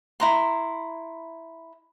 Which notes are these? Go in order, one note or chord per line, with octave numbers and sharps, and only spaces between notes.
E4 A#5 C6